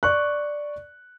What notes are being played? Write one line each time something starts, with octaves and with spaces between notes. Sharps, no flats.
D5 C#6 F#6